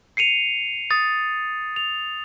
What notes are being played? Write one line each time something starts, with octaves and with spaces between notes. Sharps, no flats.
C7 C#7 D#7 F7
D#6 A6
F7